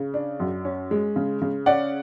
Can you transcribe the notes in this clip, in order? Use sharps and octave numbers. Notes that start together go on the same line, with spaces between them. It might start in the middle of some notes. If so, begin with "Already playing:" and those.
Already playing: C#3
D4
F#2
C#4
G#3
C#3
C#3
C#4 D5 F#5